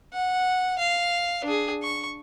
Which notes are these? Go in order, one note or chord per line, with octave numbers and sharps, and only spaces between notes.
F#5
F5
D4 G#4
C#6